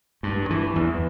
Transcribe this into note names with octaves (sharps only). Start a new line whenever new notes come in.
G2
E3
E2